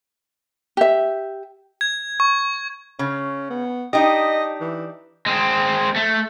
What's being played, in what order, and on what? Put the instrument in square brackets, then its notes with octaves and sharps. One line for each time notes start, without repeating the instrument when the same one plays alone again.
[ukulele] G4 E5
[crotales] G#6
C#6
[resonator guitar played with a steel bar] C#3 [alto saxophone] C#4
[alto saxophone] B3
[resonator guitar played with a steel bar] D4 D#4 G4 [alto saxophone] D#5
[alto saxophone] E3
[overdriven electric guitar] G#3 C4
A3